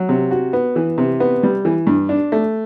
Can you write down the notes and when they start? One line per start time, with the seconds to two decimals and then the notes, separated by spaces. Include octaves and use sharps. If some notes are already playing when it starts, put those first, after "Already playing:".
Already playing: F#3
0.09 C3
0.31 F#4
0.53 B3
0.76 E3
0.98 C3
1.20 B3
1.43 G3
1.65 E3
1.87 G2
2.09 D4
2.32 A3